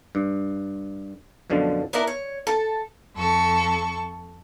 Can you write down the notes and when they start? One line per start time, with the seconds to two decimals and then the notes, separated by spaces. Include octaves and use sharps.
0.15 G2
1.50 F#2 B2 D3 F3
1.93 B3 D4 E4 A#4
2.07 C#5
2.47 A4
3.15 F2 A4 C#6